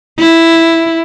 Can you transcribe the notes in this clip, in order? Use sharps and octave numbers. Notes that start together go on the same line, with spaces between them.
E4